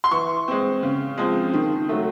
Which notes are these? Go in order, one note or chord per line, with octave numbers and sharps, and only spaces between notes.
C6
E3 C#6
G#3 C4
C#3
F3 G#3 C4
D#3
F#3 A3